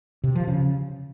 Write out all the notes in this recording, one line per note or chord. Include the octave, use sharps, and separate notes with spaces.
C3
F3
C#3